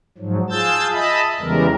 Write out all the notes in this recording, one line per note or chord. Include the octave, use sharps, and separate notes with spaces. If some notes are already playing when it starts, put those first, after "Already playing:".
G#2 F3 F#3
F4 G#4 A5 E6 G6 A6
D#5 E5 A5 B5
E2 C#3 E3 G3 G#3 A#4